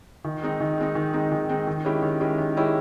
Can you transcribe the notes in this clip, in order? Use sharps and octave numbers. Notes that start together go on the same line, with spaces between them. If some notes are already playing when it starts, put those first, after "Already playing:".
D#3
G#3 C4 D#4
D#3
G#3 C4 D#4
D#3
G#3 C4 D#4
D#3
G#3 C4 D#4
D#3
G#3 C#4 E4 G4
D#3
G#3 C#4 E4 G4
D#3
G#3 C#4 E4 G4